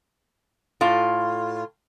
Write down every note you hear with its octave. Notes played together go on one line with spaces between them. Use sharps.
A2 F4